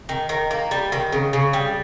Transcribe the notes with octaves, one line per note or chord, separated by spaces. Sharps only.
D#3
D#3
A#3
G3
D#3
C#3
C#3
G3